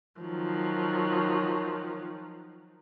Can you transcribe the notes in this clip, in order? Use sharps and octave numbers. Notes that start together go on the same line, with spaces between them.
D#3 F3 F#3